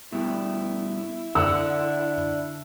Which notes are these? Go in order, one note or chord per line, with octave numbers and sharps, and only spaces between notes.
G2 B2 E4
D3 D4 F#5 E6